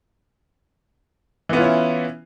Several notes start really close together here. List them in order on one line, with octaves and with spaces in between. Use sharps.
E3 B3 F4 C#4 E4